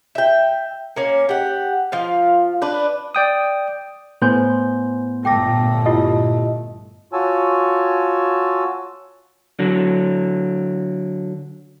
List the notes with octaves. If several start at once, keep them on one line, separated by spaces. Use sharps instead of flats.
E5 G5
A#3 C#4
G4 F#5
F3 F4 F5
D4 B4
D5 G5 D#6
A2 B3 C5 G#5 C6 G6
G1 A#2 A3 G5 D6 A#6
E4 F4 G4 D#5
F4 F#4 C#5 G#5 A5 E6
D3 F#3